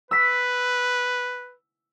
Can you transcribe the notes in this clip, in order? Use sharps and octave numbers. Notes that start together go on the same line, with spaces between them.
B4 E6 B6